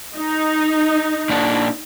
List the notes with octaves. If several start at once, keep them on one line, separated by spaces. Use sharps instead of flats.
D#4
A#2 D4 F#5